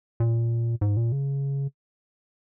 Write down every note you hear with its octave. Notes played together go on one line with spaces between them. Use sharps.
A#2
G#2
A#2
C#3